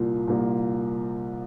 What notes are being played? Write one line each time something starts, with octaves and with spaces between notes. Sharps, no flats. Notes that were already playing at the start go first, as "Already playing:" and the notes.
Already playing: C2 A#2 A#3 F4
C2 A#2 A#3 F4